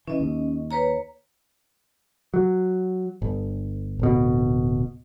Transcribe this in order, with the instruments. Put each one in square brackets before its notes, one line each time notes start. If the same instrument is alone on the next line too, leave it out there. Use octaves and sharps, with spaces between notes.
[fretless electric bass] E3 [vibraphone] C#4 D#5
[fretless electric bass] D#2
[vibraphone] B4 C#5 A#5
[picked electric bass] F#3
G1
D1 B2